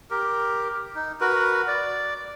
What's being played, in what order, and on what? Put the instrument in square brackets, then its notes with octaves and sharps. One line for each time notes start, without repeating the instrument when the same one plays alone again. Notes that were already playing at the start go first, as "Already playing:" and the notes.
[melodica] G4 A#4
D#4
F#4 A#4 B4
D5